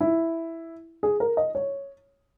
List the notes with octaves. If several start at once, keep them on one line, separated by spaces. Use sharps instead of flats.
E4
G#4
A#4
D#5
C#5